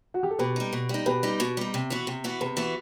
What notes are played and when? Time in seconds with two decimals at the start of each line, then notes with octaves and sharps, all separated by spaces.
0.14 F#4
0.23 G4
0.31 A4
0.39 B2 G4 B4
0.56 G3 D#4
0.73 B2
0.89 G3 D#4
1.06 B2 G4 B4
1.23 G3 D#4
1.40 B2
1.57 G3 D#4
1.74 C3
1.90 E3 B3 F#4
2.07 C3
2.24 E3 B3 F#4
2.41 C3 G4 B4
2.57 E3 B3 F#4